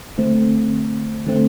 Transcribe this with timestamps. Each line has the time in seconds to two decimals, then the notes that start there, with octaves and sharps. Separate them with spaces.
0.18 D3 A3 C4
1.26 D3 A3 C4